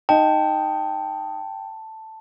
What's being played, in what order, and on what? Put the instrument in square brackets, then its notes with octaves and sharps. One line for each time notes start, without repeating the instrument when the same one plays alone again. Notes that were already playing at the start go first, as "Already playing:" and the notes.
[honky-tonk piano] D#4 [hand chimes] G5 [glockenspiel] A5